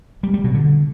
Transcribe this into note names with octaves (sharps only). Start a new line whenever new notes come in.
G3
G3
B2
D3